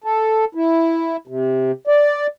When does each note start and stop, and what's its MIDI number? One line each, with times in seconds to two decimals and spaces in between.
0.04 0.45 69
0.55 1.17 64
1.28 1.72 48
1.87 2.27 74